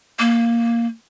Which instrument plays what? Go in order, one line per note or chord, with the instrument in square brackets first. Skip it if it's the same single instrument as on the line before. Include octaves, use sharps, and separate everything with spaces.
[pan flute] A#3